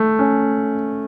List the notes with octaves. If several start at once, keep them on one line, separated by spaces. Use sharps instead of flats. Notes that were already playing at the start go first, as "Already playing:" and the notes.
Already playing: A3
C#4